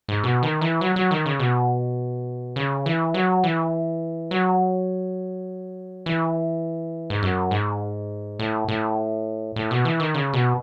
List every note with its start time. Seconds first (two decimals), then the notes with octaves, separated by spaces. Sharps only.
0.09 G#2
0.24 B2
0.43 D#3
0.61 E3
0.81 F#3
0.96 F#3
1.11 D#3
1.26 C#3
1.40 B2
2.56 C#3
2.86 E3
3.14 F#3
3.44 E3
4.31 F#3
6.06 E3
7.10 G#2
7.23 F#2
7.51 G#2
8.39 A2
8.68 A2
9.56 A2
9.71 B2
9.85 E3
10.00 D#3
10.14 C#3
10.33 B2